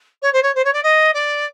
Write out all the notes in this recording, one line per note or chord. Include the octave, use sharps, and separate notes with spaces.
C#5
C5
C#5
C5
C#5
D5
D#5
D5